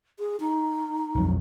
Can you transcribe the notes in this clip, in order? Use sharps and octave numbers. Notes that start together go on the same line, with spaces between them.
G#4
D#4
B1 F2 F#3